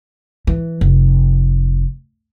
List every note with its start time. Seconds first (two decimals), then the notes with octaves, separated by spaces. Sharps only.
0.47 E3
0.81 F1